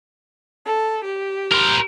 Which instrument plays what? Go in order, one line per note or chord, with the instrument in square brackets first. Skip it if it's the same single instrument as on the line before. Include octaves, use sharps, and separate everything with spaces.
[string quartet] A4
G4
[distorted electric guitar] A#4 C5